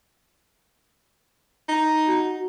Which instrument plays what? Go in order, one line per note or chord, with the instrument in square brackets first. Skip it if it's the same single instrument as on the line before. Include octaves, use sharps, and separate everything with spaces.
[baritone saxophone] D#4
[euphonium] F#4